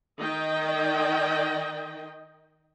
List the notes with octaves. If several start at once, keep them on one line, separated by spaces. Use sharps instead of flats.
D#3 D#5 G5